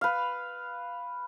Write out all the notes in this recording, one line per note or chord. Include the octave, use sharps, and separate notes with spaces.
B4 F5